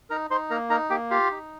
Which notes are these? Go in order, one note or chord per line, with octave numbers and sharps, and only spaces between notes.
D#4 A#4 A#5
D#4 C5 C6
A#3 A#4 A#5
D#4 A#4 A#5
A#3 G4 G5
F4 G4 F5
D#4